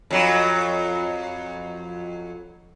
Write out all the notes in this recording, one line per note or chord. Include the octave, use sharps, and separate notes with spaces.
F2 F#3